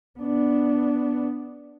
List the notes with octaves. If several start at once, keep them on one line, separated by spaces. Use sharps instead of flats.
B3 D4